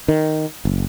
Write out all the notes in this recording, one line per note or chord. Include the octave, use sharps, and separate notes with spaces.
D#3
F#1